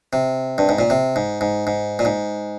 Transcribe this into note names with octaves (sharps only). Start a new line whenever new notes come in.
C3
G2
G#2
A#2
C3
G#2
G#2
G#2
A#2
G#2